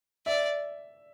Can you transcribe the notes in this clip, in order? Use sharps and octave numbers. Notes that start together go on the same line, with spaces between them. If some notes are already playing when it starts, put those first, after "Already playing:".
D5 E5